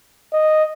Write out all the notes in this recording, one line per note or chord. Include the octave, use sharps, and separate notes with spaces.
D#5